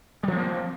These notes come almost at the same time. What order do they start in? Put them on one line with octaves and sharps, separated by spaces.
G3 F3 C4 A#3